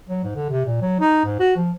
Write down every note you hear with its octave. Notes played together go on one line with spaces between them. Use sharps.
F#3
G#2
D3
C3
A#2
F#3
D#4
G#2
F#4
F3